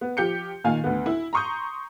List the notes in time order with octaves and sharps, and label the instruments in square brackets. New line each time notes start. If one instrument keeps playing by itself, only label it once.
[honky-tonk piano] B3
F3 G4 G6 C#7
A#2 D#3 F5 G#5
D2 B3
E4
A#5 C6 C#6 D#6 G6